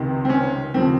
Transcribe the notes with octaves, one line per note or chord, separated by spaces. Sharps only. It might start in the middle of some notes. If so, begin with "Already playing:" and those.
Already playing: C#2 C3 D#3
C4
C#4
D#2 C#3 F3 C4